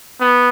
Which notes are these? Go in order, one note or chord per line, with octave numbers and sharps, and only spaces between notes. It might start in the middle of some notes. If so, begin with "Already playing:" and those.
B3